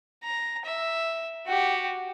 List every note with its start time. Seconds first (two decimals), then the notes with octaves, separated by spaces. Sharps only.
0.23 A#5
0.66 E5
1.46 F#4 G4